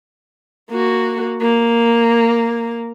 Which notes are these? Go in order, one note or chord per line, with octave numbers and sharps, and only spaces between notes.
A#3 F#4
A#3